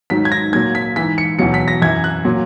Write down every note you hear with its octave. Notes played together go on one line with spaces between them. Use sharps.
G#2 D#3 F#3 B6
G#6
A#6
A#2 F#3 G#6
B6
G#2 E3 B6
C#7
E2 B2 F#3 C#7
B6
A#6
F#2 E3 G#6
F#6
A#2 F#3